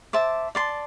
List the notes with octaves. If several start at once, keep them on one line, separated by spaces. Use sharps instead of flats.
C5 E5 A5 D6
D5 A5 C6